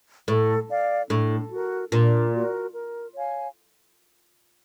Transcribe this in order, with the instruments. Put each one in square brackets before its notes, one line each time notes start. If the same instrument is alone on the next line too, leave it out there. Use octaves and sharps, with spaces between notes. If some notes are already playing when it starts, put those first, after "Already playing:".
[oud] A2 [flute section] A4
[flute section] D5 F5
[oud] A2 [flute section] D4
[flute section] F#4 A#4
[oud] A#2 [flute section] D4
[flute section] F#4 A#4
A#4
C#5 F5 G#5